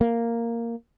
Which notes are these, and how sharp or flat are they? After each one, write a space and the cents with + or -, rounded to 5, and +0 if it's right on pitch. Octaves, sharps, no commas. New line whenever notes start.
A#3 -5